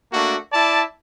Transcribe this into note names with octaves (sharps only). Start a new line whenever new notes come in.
A3 A#3 D4 F#4
E4 D5 A5